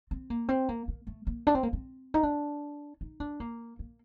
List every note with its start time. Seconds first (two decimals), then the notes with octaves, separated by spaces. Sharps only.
0.11 C4
0.30 A#3
0.49 C4
0.69 A#3
0.88 A#3
1.07 A3
1.27 A#3
1.47 D4
1.55 C4
1.63 A#3
1.73 C4
2.14 D#4
2.23 D4
3.01 D#4
3.20 D4
3.40 A#3
3.79 A#3